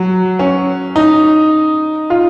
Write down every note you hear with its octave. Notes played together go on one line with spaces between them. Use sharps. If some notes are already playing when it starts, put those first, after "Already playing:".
Already playing: F#3
C#4
D#4
F4